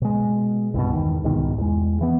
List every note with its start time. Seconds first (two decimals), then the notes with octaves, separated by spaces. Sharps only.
0.02 B2 G#3
0.74 C2 G2 B2
0.93 E2 D#3
1.24 C2 G#2 B2 D#3
1.58 E2 G#3
2.01 E3 B3